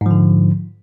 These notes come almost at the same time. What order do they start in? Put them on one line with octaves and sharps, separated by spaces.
G#2 F3 D3